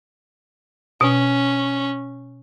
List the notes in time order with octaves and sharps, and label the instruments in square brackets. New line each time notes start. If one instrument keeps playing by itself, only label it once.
[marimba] B2 [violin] C#4